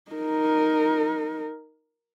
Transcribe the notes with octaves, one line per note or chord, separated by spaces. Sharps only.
D#4 A#4